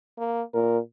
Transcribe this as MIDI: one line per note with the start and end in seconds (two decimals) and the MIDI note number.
0.19 0.42 58
0.54 0.79 46
0.54 0.78 70